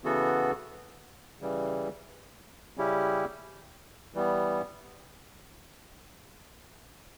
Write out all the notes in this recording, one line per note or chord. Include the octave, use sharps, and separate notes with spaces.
C#3 E3 B3 F#4 A4
C#3 E3 G3
C#3 G3 C#4 E4 G4
E3 G3 B3